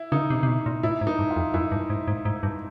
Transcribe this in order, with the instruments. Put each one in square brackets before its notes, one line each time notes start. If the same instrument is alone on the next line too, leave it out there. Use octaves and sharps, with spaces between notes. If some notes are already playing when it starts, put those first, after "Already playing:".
Already playing: [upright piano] E4
[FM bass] C#3 [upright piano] D#4
[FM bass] C3
C3
B2
A#2
[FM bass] A2 [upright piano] E4
[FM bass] G#2
[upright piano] D#4
[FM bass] G2
[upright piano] F4
[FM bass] F2
[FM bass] F#2 [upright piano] E4
[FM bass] G2
G#2
G#2
G#2
G2